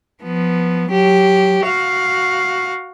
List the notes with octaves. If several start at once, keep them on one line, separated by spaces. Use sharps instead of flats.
F3 B3
F#3 G4
F#4 F5